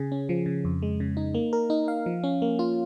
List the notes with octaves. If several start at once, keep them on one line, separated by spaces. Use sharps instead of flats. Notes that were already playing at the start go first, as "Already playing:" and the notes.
Already playing: C#3 G#4
C#4
F3
C#3
F2
G#3
C#3
D#4
A#3
A#4
D#4
F5
F3
C#4
A#3
F4